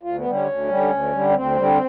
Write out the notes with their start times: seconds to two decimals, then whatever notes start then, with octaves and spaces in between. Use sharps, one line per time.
0.03 D2 F4
0.18 B3
0.25 D3 G3
0.33 C#4
0.47 D2
0.69 D3 G3
0.90 D2
1.12 D3 G3
1.29 C#4
1.35 D2 C4
1.56 D3 G3